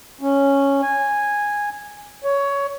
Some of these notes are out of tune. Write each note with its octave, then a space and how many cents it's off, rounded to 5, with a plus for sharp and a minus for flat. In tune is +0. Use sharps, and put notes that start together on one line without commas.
C#4 +0
G#5 -10
C#5 +15